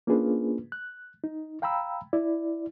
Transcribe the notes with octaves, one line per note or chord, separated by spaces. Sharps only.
A#3 C#4 D4 F4 G#4 B4
F#6
D#4
F5 G5 A#5 B5 E6
E4 D5